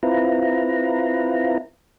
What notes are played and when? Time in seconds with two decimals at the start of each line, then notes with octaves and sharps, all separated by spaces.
0.03 C4 E4 F4 B4 A#5